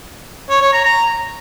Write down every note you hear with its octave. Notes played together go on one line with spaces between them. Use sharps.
C#5
C#5
A#5
A#5